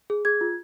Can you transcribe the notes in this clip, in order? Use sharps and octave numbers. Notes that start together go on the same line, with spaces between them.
G#4
G#4 G#6
F4